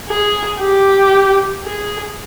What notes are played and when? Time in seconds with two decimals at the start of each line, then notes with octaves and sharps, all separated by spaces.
0.09 G#4
0.61 G4
1.63 G#4